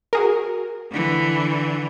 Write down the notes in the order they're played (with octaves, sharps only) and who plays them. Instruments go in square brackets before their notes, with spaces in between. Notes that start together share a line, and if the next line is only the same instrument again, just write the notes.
[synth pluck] F#4 G#4 A#4
[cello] D3 E3